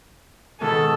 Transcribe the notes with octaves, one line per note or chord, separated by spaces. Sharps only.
G#2 B2 D#3 A4